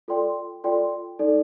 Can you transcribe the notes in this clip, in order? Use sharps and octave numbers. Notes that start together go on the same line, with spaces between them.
F4 A4 D5 G5 C6
F4 A4 D5 G5 C6
D#4 A4 D5